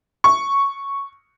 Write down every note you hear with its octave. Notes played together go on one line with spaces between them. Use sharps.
C#6